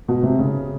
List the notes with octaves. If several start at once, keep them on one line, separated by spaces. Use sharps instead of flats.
B2
C3
C#3